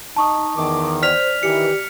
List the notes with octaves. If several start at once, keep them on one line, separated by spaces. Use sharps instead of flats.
D#4 A5 C#6 D#6
E2 D#3 D6
C5 D5 F6 B6 F7
D#3 E3 G4 C#7